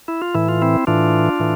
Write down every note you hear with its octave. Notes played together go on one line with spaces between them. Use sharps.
E4
F4
A2 E3 E4
F4
C4 E4
A2 E3 D4 F4
A2 E3